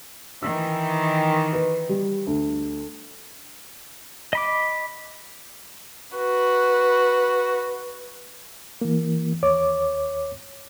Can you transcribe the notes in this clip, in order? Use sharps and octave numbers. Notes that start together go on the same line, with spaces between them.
D#3 E3 E6
B4
G3
D2
D#5 B5 D6
F#4 B4
E3 A#3
D#2 C#5 D6